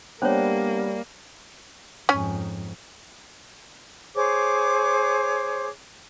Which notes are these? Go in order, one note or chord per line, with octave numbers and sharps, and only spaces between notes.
G3 A#3 B3 D4 C5 C#5 G5
F2 G#2 C#4 G#5
G#4 C5 C#5 D6